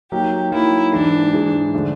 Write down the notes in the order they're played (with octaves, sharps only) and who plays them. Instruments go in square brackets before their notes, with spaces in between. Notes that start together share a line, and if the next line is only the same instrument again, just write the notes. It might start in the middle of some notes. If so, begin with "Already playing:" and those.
[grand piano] F#3 A#3 D#4 [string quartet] G4
[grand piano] F#3 A#3 D#4 [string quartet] E4
[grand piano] G#2 E3 G#3 [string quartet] D4
[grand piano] G#2 E3 G#3
D3 F3 A3 D4